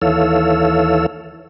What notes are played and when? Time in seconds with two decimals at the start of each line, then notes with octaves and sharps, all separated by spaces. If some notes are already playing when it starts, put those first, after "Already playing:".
0.02 D#2 E3 A4 C#5 F5 E6